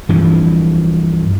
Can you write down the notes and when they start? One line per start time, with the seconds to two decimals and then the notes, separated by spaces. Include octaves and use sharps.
0.09 G2 E3 F3